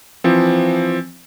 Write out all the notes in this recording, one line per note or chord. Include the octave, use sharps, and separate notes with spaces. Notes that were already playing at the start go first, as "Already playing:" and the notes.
E3 F3 C4